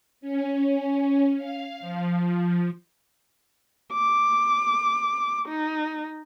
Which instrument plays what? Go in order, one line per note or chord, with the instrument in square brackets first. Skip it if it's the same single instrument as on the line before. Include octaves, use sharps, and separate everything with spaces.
[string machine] C#4
F5
F3
[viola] D6
D#4